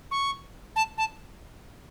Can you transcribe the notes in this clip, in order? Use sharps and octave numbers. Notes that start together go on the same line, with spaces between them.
C#6
A5
A5